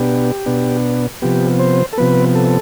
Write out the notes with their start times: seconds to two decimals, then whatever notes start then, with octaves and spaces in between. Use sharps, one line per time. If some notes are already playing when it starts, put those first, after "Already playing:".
Already playing: B2 B3 D4 G4
0.46 B2 B3 D4
1.22 C3 F3 B3 G4
1.59 C5
1.93 A4
1.98 C3 F3 B3 B4
2.35 A4